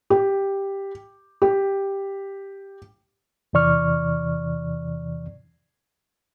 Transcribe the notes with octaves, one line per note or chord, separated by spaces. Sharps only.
G4
G4
E2 C3 E3 D5 C#6 F6